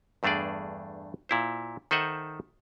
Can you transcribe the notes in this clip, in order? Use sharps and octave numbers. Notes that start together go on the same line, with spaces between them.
E2 G2 A3 D4 G#4 D5
A#2 E4 C5
D#3 A4 C5 D#5 E5 F#5